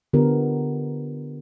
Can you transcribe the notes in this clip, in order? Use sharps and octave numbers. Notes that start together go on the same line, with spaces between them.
D3 B3 F4 G4 A#4